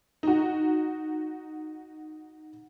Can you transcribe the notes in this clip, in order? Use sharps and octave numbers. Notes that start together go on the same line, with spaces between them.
D#4 F#4